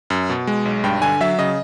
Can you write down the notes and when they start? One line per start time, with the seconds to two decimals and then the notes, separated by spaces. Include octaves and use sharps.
0.10 F#2
0.29 B2
0.47 G#3
0.65 B1
0.84 G2 G5
1.02 D3 G#5
1.21 F#3 E5
1.39 C#3 D#5